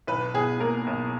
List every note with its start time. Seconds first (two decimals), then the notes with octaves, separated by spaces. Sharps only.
0.07 B1 B4
0.34 B2 G#4
0.60 A#3 A#4
0.87 B1